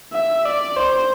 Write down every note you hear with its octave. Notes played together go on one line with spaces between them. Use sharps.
E5
D5
C5